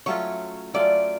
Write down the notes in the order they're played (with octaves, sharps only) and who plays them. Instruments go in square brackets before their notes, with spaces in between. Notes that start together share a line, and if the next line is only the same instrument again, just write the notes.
[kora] F#3 A3 C#4 F4 [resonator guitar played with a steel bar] C#5
[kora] F#3 A3 C#4 F4 [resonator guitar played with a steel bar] D5